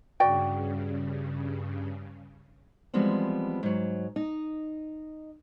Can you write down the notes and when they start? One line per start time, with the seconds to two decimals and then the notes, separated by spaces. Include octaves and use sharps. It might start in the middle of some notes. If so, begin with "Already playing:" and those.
0.20 G2 C#3 F#4 D5 G5
2.94 E3 F3 G3 G#3 B3 C4
3.63 G#2 F#3
4.16 D#4 D#5